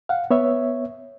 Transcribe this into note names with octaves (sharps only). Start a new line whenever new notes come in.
F5 F#5
B3 C#5 E5